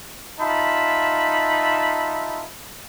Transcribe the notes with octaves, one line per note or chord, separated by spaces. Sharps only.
D#4 F4 E5 A5 B5